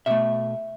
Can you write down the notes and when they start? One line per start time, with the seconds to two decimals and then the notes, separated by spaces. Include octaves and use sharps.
0.06 B2 A3 E5